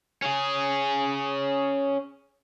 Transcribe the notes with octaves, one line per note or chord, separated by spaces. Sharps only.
C#4 G#4